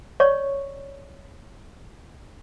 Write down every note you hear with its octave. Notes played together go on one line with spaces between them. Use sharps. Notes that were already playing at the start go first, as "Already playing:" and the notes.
C#5 D5 C#6